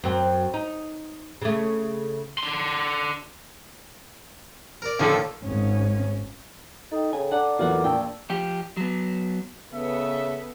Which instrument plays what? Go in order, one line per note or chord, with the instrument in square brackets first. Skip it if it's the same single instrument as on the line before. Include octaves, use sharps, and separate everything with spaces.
[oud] F#2 C4
D#4
C#3 A3
[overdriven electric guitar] D3 C6
[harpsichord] A#4 D5
[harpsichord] A2 D#3 A#3 [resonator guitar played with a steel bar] D3 F3 A4
[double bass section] G#1 G#2 C#4
[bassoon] D#4 [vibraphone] A4 G5
[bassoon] C#3 [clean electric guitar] G#5
[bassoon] D4 [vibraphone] A4 A#5 D6 [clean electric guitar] F#5
[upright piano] E2 E3 F#3 [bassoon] A#2 [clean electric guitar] F4 F#5
[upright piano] A#1 D4 A5 [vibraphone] F5 E6 [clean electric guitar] G5
[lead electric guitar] F3 G4
F#3 B3
[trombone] C#3 [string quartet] B3 A4 B4 [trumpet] E5